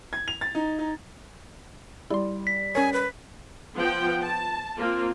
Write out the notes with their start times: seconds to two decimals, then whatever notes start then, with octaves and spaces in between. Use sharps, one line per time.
0.13 G#6
0.28 F7
0.41 A6
0.55 D#4
0.79 D#4
2.11 G3 E4 C6
2.47 B6
2.75 C#4 A#4 C#5 G#5
2.93 B4
3.74 F3 B3 F#5 G5
4.22 A5
4.78 A#3 C4 F4